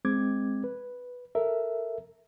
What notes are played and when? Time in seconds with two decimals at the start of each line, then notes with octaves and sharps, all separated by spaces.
0.05 G#3 C4 D6 G#6
0.64 B4
1.35 A4 A#4 E5